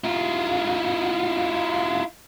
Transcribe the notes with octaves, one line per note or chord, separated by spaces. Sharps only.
E4 F4